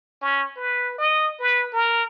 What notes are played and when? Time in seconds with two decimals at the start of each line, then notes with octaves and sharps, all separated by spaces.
0.22 C#4
0.57 B4
0.98 D#5
1.40 B4
1.72 A#4